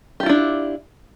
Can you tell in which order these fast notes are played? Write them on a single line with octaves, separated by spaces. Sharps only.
G4 F4 E4 D4